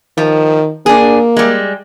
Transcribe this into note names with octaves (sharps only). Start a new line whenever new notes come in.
D#3 F3
A#3 D4 G#4
G3 G#3